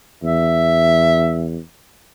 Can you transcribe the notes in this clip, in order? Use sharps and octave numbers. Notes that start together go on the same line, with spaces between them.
E2 E5